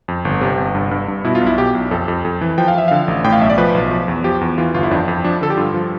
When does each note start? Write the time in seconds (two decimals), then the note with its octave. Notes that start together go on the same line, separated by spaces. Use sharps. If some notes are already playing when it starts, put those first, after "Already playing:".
0.08 F2
0.25 G1
0.41 C3
0.58 G1
0.75 G2
0.91 G2
1.08 G2
1.24 B2 E4
1.35 F4
1.41 B1
1.47 E4
1.58 B2 G4
1.75 B1
1.91 F2 A4
2.08 F2
2.25 F2
2.41 E3
2.58 F3 G5
2.68 F5
2.75 F3 E5
2.88 D3 F5
3.08 A1
3.24 A2 G5
3.33 F5
3.41 B1 E5
3.50 D5
3.58 F3 B4
3.75 B1
3.91 F3
4.08 E2
4.24 F3 G4
4.41 E2
4.58 E3 F4
4.74 G1 F4
4.83 E4
4.91 F2 D4
5.08 F2
5.24 F3 D4
5.41 D3 A4
5.50 G4
5.57 G2 F4
5.74 F3